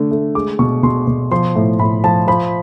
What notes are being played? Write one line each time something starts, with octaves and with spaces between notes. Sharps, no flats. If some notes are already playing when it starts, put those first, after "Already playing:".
Already playing: D3 A3
A3
G#3 D6
B2 C#6
B2 C6
B2
F3 C6
A2
A2 B5
F3 A5
F3 B5